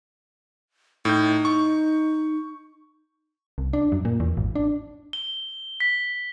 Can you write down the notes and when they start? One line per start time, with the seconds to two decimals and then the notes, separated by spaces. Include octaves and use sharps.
1.05 A2 D#4 G6
1.45 C#6
3.58 C2
3.73 D4
3.92 F#2
4.05 A#2
4.20 E2
4.37 G#1
4.55 D4
5.13 G7
5.80 B6